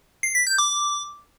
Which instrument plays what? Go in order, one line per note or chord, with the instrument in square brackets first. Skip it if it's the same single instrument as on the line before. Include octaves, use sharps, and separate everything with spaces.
[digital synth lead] C7
B6
G6
D6